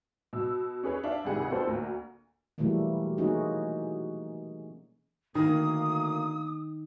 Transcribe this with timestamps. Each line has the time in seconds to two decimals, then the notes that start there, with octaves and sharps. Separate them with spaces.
0.33 B2 E6
0.83 C#4 G#4 B4 C#5
1.03 D4 E5 F5
1.24 G#1 C#2 C3 G#4 F#5
1.50 B3 C4 F4 A4 C5
1.67 D2 A#3
2.58 B2 E3 F#3 G3 A3 A#3
3.18 G#3 A#3 C#4 D#4 F#4 G#4
5.35 D2 D#3 A#3 D#6